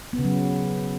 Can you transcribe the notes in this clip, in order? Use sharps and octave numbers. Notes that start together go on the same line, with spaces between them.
B3
C#3
F#3